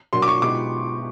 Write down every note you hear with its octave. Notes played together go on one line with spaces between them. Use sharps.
B2 F#3 A#3 D4 F#4 C6
D6
C#6
B2 G#3 B3 D#4 G4 D6